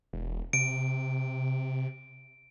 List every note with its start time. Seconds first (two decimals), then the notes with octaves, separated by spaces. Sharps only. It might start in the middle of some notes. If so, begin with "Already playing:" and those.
0.13 E1
0.53 C3 D7